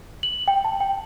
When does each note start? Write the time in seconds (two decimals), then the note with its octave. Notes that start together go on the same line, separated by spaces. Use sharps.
0.23 F#7
0.48 G5
0.65 A5
0.80 G5